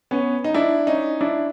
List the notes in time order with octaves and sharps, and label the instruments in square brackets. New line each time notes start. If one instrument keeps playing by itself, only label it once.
[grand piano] B3 C#4
D#4
D4 E4
C#4 D#4
D4 E4